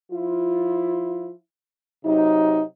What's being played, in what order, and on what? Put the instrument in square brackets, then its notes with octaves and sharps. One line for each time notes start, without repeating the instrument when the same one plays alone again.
[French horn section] F3 E4 F4
C3 F#3 D#4